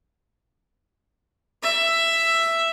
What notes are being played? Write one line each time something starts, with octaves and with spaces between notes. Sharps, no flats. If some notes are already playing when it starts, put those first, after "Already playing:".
E5